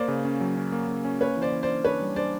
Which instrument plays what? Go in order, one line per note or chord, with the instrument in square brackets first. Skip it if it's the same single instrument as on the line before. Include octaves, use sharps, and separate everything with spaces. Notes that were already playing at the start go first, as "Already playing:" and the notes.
Already playing: [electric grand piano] A#3 [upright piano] C5 D5
[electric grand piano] C#3
C#4
F#3
C#4
A#3
C#3
C#4
[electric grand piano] A#3 [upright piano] B4 C#5
[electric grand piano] E3
[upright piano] C5 D5
[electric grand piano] E3
[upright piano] C5 D5
[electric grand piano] D4
[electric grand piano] D4 [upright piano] B4 C#5
[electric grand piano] G3
[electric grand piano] D4 [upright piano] C5 D5